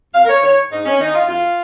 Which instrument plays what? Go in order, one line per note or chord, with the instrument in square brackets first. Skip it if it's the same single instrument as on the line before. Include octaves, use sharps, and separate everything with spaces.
[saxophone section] F2 F5
A#4
C#5
D#3 C#5
G#2 D#4
C#4
D#3 D#4
F4
F2 F4